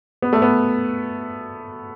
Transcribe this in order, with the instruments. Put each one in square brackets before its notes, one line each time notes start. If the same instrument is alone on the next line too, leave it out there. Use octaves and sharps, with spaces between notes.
[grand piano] B3
A3
B3